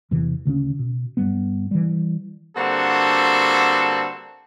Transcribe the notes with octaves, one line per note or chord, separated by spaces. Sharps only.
E2 C3 E3
D2 C#3 C4 C#4
B2
G2 G3 B3
E3 G3
G2 D3 A#3 C4 F#4 A4